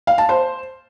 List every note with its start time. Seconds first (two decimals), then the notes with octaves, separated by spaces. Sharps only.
0.07 F5
0.18 A5
0.29 C5